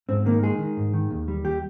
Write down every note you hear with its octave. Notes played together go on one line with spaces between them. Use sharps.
G#2 C4
D#3 A#3
G#3 G#4
D#3
G#2
D#3
D#2
G3
D#2 G4